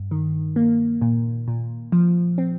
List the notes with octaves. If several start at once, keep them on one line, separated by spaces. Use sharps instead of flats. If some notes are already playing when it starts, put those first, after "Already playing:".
Already playing: G2
D#3
A#3
A#2
A#2
F3
C4